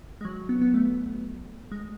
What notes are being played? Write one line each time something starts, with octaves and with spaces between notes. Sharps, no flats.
G#3
F#3
B3
B3
A3
G#3